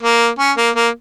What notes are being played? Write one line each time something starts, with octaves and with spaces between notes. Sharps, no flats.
A#3
C#4
A#3
A#3